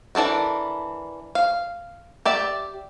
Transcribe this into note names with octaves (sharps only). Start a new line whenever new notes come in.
E3 D4 A4 A#4
F5
G4 D5 E5